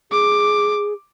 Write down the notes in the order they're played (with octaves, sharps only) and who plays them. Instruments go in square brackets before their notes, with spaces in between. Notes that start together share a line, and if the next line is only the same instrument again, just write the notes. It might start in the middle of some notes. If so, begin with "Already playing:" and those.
[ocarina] G#4 [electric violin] D6